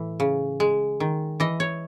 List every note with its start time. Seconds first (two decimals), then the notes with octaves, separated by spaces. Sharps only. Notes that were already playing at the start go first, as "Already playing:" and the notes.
Already playing: A2 E3
0.20 C#3
0.60 G#3
1.00 D#3
1.40 E3 D#5
1.60 C#5